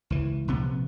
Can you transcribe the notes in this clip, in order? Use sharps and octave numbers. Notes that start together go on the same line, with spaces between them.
C#2 E3
A#1 C3 B3